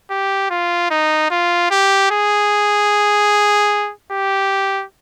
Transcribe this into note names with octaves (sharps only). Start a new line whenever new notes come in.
G4
F4
D#4
F4
G4
G#4
G4